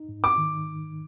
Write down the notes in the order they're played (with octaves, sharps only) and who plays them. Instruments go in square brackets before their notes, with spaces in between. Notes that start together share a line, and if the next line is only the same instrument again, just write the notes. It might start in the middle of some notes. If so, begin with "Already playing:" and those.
Already playing: [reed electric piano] D#4
G#2
[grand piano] D6
[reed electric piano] D#3